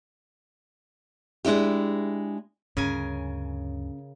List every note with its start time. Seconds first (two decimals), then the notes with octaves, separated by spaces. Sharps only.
1.45 G#3 D4 E4 G4
2.77 D2 G2 C#3 C#4 A#4 G#5